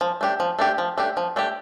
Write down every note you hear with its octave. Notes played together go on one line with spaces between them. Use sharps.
F3
A3 D4 G4
F3
A3 D4 G4
F3
A3 D4 G4
F3
A3 D4 G4